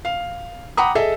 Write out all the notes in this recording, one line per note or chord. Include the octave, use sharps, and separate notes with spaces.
F5
F#5 G5 A#5 B5 D6 D#6
G#4 A4 D#5 E5